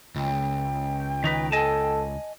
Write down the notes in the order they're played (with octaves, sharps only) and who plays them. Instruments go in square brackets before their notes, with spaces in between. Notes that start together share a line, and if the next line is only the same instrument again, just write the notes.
[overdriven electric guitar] C#2 [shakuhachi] G5
[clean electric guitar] D#3 D#4 B4
[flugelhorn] A4 [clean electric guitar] D#5 G#5 A5